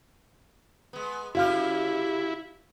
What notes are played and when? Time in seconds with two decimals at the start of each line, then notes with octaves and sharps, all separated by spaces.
0.93 G#3 B3
1.35 C#3 G3 E4 F#4 G4 F5 F6